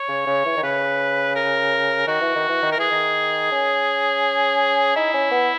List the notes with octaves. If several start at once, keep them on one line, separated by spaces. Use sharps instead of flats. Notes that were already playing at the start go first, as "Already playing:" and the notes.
Already playing: C#5
C#3
C#3
E3
D#3
C#3 B4
A#4
D#3 F#4
E3
D#3
E3
D#3
A#4
E3 G#4
D#3
C#4
D#4 E4
C#4
B3